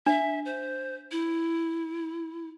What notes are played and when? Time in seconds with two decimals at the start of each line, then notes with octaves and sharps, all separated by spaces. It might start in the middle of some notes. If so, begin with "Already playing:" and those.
0.06 D4 E5
0.45 C5
1.12 E4